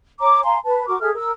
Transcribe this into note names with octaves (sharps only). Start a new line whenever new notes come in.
C#5 A#5 D6
F5 G#5 A#5 C6
B4 A5
F#4 A#4 C#6 D6
G#4 A4 E5 F6
A#4 E6